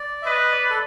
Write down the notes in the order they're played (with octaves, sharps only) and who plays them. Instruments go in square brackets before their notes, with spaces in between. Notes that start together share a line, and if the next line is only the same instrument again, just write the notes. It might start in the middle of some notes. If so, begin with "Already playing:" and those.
Already playing: [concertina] D5
E5
[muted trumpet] B4 [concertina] D#5
[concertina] D5
A4